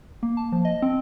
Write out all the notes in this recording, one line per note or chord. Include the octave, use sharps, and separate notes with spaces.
A#3
A5
F3
D#5
C4